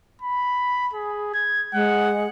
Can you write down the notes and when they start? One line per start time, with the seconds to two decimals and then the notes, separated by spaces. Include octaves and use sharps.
0.22 B5
0.93 G#4
1.34 G#6
1.74 G#3 F#5